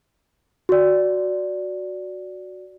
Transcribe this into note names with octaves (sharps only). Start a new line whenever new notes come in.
F#4 D5